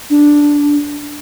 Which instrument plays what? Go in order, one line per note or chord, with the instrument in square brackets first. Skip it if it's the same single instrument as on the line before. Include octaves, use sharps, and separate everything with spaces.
[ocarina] D4